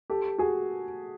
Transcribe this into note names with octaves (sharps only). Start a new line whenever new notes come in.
G4 A4
F#4 G#4